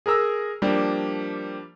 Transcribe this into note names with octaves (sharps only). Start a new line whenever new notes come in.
G#4 A#4 A#5 E6
F3 G3 A#3 D4